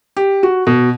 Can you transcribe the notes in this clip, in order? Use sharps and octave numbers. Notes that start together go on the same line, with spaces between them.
G4
F#4
B2